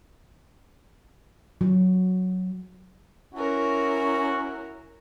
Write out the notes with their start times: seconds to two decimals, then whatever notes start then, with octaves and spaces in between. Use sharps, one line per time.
1.61 F#3
3.34 C#4 E4 F#4 A#4